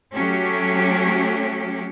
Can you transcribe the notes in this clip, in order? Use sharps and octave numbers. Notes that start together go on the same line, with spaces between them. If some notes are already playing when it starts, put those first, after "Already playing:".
F#3 A3 C#4 G4